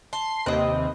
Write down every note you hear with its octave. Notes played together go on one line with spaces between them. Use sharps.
A5 C6 C7
D#2 C3 C4 B4 D#5